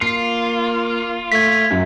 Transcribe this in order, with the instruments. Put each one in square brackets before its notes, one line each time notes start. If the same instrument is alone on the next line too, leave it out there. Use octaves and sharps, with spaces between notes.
[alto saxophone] A#3 [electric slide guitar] F4 [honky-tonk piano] C7
[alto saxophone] A3 [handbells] G#6 B6
[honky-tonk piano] F#2